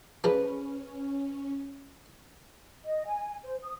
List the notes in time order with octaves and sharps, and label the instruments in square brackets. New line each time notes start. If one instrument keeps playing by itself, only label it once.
[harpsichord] F3 G#3 D4 [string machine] C#4 [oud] B4
[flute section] D#5
G#5
C5
D#6